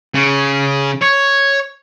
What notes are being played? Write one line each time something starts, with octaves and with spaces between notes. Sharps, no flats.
C#3
C#5